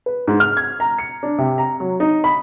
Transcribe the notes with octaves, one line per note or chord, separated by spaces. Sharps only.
B4
G#2
F6
G#6
A#5
C#7
D4
C3
A#5
F#3
D#4
B5